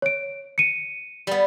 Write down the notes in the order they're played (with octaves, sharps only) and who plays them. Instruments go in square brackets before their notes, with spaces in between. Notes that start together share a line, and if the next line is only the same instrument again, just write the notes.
[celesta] C#5 D7
C#7 D#7
[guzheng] G3 B3